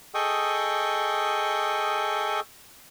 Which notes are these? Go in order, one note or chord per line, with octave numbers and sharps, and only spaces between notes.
G#4 A4 D#5 G5 C#6 D#6